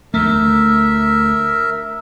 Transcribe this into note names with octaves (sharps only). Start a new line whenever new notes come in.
D2 A3 A#4 E5